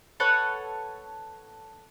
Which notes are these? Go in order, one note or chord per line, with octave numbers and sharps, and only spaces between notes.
A4 B4 C#5 F#5